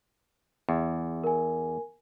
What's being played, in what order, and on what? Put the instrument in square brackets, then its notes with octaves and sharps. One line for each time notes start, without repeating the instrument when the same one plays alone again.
[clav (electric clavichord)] E2
[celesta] A#4 G#5